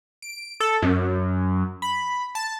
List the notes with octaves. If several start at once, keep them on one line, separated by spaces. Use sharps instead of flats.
D7
A4
F#2
B5
A5